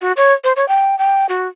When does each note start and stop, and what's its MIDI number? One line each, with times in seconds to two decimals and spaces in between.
0.01 0.12 66
0.17 0.33 73
0.44 0.53 72
0.56 0.67 73
0.68 0.98 79
0.98 1.26 79
1.29 1.47 66